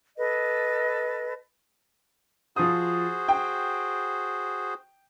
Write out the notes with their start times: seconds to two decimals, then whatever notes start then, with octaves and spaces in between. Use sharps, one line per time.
0.17 A4 B4 D#5
2.56 F3 F#4 G#4 C5 D#6
3.28 G5